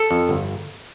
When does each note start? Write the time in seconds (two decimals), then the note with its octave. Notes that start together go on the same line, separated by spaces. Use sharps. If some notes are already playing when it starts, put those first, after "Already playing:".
Already playing: A4
0.11 F2
0.29 G1